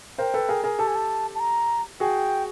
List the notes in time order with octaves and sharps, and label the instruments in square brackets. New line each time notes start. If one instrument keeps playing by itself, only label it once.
[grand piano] A#4 C5 [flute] G5
[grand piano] A4 B4
G#4 A#4
G#4 A#4
[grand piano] G4 A4 [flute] A5
[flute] G#5
A5
A5
A#5
[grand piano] F#4 G#4 [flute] G5